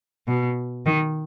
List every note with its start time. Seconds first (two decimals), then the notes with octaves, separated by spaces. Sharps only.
0.28 B2
0.86 D#3